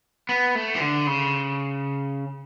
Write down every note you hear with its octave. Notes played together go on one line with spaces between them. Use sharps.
B3
A3
E3
D3
C#3